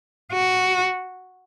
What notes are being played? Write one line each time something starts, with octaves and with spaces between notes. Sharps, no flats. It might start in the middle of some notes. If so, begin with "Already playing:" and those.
F#4